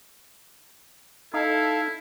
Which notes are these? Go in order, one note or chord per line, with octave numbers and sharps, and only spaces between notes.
D#4 E4 A4 F5